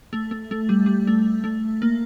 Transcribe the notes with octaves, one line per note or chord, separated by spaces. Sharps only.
A3
A3
A3
G3
G3
A3
A3
A#3